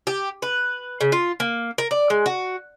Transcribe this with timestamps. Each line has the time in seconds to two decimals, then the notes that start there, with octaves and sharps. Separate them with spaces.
0.07 G4
0.42 B4
1.01 C#3
1.12 F4
1.40 A#3
1.78 A#4
1.91 D5
2.10 G#3
2.26 F#4